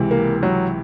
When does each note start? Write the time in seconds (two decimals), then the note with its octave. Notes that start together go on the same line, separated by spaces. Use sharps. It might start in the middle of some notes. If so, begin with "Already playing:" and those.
Already playing: C#2 C3 E3
0.11 A#3
0.43 F#3